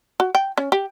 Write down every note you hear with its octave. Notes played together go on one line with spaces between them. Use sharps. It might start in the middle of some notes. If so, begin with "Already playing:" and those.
F#4
G5
C#4
G4